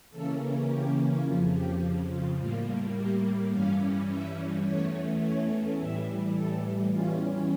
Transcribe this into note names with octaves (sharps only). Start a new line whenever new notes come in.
C#3 E3 A#3 C#4 A4
G4
F2 C#3 F3 F4
G4
F4
A2 G3 A#3 F4
G4
G2 E3 G3 C#4 F5
E5
E2 E3 A3 C#4 C#5
C#5
A2 E3 G3 E5
A4
E2 E3 G3 C#4 F4